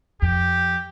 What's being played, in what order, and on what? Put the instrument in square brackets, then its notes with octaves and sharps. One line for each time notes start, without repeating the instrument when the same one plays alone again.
[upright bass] F2 [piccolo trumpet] G4